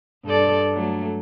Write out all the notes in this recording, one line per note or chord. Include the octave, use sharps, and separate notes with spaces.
G2 A4 D5
F#3 A3